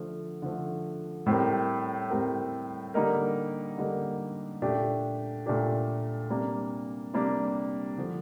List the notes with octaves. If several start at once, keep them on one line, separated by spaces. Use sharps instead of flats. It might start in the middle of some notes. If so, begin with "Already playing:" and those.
Already playing: D3 F3 A3
D3 F3 A3
A2 G3 C4 G4 A#4
A2 G3 C4 G4 A#4
D3 G3 A#3 D#4 A#4
D3 G3 A#3 D#4 A#4
A#2 A3 D4 G4
A#2 A3 D4 G4
C3 G3 A#3 D4
C3 G3 A#3 D4
D3 F3